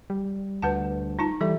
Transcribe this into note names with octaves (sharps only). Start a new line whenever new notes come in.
G3
D2 B4 F#5 A5
D#4 F4 A5
E3 G3 A4 E5